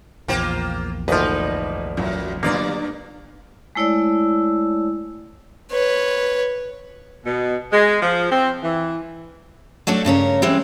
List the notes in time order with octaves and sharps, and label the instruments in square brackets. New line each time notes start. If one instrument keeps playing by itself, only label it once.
[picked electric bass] A#1 E2 [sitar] A#3 F4 C5 [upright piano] G5
[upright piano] G#1 A#3 D#5 [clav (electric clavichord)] D2 F3 [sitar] D#4 B4
[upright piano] A1 F#3 F4 [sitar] F#2
[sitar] G2 D5 [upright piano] D3 F#3 B3 [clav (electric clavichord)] A#3 F4
[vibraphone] G#3 A3 E4 C#5 D5 E6
[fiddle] B4 C#5
[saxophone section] B2
G#3
F3
C4
E3
[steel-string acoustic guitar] F#3 A3 D4 F#4 A4
G2 C#3 C#4 A#4
E3 G3 G#3 A#3 C4 C#4